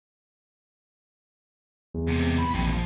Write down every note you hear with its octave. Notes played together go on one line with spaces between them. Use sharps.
E2
G#2 C3
B5
A#1 D#3 C4
D2 F3